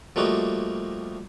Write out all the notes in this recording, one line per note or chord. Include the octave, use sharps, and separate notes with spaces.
F3 G3 A3 A#3 D#4 F#4